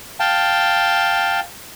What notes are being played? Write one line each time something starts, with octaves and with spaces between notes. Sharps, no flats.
F5 G5 A5